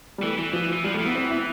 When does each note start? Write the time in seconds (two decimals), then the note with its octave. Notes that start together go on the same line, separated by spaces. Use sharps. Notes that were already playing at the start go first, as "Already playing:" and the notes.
0.18 G3
0.23 E3 A3
0.39 E3
0.53 E3 F3
0.69 F3
0.73 E3
0.84 F3 G3
0.94 A3
1.00 E3
1.05 B3
1.15 C4
1.30 E4